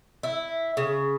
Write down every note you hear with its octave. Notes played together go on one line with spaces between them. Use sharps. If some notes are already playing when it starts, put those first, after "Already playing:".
E4
C#3